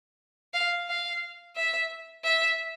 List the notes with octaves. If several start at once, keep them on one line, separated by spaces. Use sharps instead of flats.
F5
F5
E5
E5